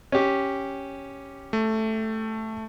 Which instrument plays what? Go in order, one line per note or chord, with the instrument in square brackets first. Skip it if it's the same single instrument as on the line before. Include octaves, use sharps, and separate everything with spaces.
[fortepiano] C#4 G4
[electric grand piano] A3